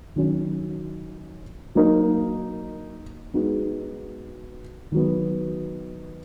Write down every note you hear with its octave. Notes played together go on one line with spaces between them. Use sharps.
D#3 F#3 C#4
F#3 A#3 D#4 A#4
G#3 B3 D#4 F#4
D#3 F#3 B3